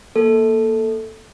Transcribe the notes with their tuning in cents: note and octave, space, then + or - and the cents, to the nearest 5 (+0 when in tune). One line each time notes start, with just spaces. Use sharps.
A#3 +0 A4 +0